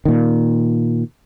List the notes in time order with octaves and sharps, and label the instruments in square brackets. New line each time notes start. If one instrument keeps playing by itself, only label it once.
[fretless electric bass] A#2 D#3